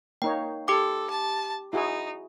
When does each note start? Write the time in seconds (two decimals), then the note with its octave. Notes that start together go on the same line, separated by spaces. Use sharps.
0.22 A#3 D#4 C#5 G5
0.68 G4 A4 G5 D6
1.10 A5
1.73 D#4 E4 F#4 G#4